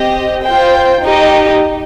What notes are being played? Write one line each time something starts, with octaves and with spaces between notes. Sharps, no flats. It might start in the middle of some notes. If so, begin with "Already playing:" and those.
Already playing: C4 G4 D#5
F4 C5 G5
D#4 G4 D#5